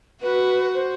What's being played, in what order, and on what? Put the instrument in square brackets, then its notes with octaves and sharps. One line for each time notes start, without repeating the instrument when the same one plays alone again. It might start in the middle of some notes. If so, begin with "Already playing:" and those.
[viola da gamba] F#4 [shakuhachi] B4
[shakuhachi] C5